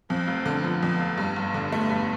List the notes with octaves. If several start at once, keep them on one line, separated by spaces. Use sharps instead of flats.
F2 C4
F1
D3
F3 B3
F2
F1
G2
G1
D3
A3 B3
G2